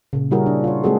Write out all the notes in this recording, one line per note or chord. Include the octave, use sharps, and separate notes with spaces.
A#2 C#3
G3 C#4 E4 F#4 G#4 A#4
D4
F4 C#5
G#3 A#3 C4 F#4 G#4 A4